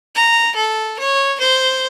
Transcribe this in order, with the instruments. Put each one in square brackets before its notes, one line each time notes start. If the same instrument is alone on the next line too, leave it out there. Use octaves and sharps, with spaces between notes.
[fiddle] A#5
A4
C#5
C5